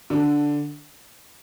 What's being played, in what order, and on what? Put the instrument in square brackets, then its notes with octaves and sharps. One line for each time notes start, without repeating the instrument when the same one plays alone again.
[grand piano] D3